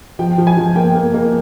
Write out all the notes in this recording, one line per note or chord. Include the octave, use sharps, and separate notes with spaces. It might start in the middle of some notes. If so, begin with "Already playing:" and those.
F3 G5
F3
G#5
F3
A#3 G5
A#3
A#3